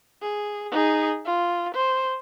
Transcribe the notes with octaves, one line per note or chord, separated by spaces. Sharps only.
G#4
D#4 G#4
F4
C5